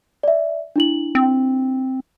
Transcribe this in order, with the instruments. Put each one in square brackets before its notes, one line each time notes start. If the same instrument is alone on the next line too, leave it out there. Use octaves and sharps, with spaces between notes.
[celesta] D5 E5
D4 E4 F#7
[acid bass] C4